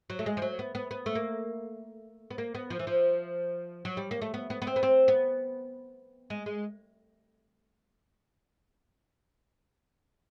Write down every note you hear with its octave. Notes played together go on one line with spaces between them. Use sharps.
F#3
A3
G#3
F3
F#3
B3
B3
B3
A3
A#3
B3
A#3
B3
F3
E3
F3
F#3
G3
A#3
A3
B3
B3
B3
C4
B3
C4
B3
G#3
G#3